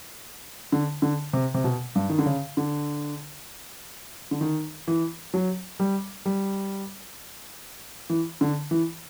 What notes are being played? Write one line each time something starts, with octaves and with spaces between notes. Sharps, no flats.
D3
D3
C3
C3
B2
G2
D#3
D3
C#3
D3
D3
D#3
E3
F#3
G3
G3
E3
D3
E3